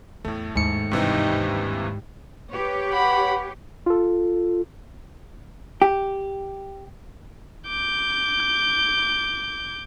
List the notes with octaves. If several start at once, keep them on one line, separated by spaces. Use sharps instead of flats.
E2 A2 A3
D#2 G#2 C#7
G2 C3 E3 D#4 G4
G4 B4 C#5
F#5 B5
F4 A4
G4
D6 G6